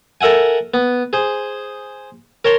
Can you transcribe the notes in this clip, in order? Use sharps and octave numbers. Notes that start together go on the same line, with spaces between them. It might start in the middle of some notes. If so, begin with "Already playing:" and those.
A4 A#4 E5 F#5 G#5
B3
G#4 C5
A#4 C#5 A5 C6